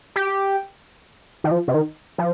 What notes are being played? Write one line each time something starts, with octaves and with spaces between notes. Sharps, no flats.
G4
D#3
F3
C3
D#3
F3